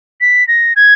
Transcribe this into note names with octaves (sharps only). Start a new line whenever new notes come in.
B6
A#6
G#6